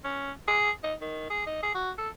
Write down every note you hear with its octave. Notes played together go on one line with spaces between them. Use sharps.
C#4
G#4
D#4
D#3
G#4
D#4
G#4
F#4
A4